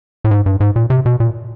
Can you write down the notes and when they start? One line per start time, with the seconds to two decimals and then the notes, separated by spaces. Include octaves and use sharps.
0.24 A2
0.31 G#2
0.46 G2
0.60 G#2
0.76 A#2
0.90 C3
1.06 B2
1.20 A#2